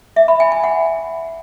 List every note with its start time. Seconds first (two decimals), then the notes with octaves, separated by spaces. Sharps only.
0.16 E5
0.28 B5
0.40 G#5
0.52 G#5
0.64 F#5